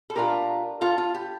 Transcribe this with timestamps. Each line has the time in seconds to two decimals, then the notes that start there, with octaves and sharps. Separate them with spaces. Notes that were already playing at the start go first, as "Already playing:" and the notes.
0.10 A4
0.15 A#2 A3 D4 F4 G4 A#4
0.81 F4 A4
0.98 F4
1.14 G4